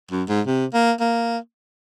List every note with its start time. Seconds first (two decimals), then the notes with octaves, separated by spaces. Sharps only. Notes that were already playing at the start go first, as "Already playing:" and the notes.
0.11 F#2
0.29 G#2
0.47 C3
0.74 A#3
1.00 A#3